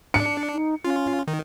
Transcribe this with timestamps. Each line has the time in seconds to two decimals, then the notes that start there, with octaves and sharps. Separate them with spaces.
0.14 D4 C#7
0.53 D#4
0.85 C#4 F4
1.28 D#3